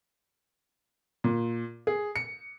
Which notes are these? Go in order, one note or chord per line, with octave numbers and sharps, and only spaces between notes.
A#2
G#4
C#7